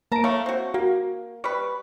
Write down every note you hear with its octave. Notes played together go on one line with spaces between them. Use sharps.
A#3 A5 A#5 D7
A3 C#5 F5 C#6
C4 F#4
A#3 F#4
G3 B4 B5 C#6